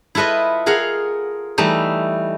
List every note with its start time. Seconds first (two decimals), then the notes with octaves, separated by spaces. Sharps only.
0.15 E4 F4 A4 B4 D#5
0.66 F4 G#4 A#4 F5 F#5
1.58 E3 G3 A3 D#4